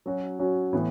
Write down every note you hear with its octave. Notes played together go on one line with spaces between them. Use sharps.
F#3 C#4 F#4
F#3 C#4 F#4
A2 E3 B3